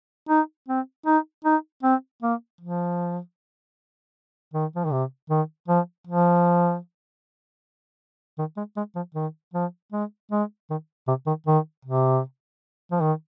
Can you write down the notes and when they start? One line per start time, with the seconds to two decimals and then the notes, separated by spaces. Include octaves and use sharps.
0.29 D#4
0.69 C4
1.06 D#4
1.45 D#4
1.83 C4
2.23 A#3
2.61 F3
4.54 D#3
4.75 F3
4.84 D#3
4.92 C3
5.30 D#3
5.68 F3
6.07 F3
8.38 D#3
8.57 G#3
8.77 G#3
8.96 F3
9.15 D#3
9.54 F3
9.92 G#3
10.32 G#3
10.70 D#3
11.08 C3
11.27 D#3
11.47 D#3
11.85 C3
12.91 F3
13.01 D#3